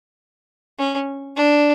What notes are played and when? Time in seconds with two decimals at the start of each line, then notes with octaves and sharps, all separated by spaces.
0.79 C#4
1.37 D4